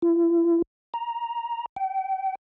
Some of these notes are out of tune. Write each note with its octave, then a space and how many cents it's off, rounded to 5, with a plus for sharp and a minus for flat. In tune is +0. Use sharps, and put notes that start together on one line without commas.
E4 +40
A#5 +10
G5 -35